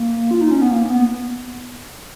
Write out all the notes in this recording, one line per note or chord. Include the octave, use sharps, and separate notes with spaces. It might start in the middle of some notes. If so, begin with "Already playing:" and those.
Already playing: A#3
F4
D#4
C#4
B3
A#3
B3